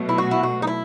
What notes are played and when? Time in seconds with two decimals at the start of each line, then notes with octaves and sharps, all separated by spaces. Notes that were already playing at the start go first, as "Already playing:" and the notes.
Already playing: B2 F#3 A3
0.09 E4
0.18 F#4
0.31 E4
0.43 F#4
0.62 D#4
0.67 E4